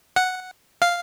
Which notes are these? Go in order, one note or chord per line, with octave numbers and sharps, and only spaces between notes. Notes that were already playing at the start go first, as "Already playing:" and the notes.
F#5
F5